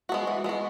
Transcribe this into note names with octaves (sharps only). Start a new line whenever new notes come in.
G#3 B3 F#4
E3
G#3 B3 F#4